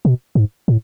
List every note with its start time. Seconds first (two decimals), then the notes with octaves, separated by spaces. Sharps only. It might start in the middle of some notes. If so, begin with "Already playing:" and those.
0.05 B2
0.35 G#2
0.68 A2